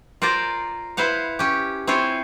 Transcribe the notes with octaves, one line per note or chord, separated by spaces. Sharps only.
F4 A#4 C5 D5 A#5
E4 B4 C5 F5 F#5
C#4 G4
C4 E4 F4 C5 C#5 G#5